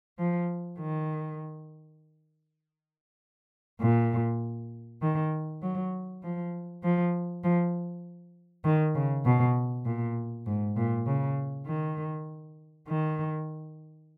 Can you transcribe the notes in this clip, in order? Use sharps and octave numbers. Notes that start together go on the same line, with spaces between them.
F3
D#3
A#2
D#3
F#3
F3
F3
F3
D#3
C#3
B2
A#2
G#2
A#2
C#3
D#3
D#3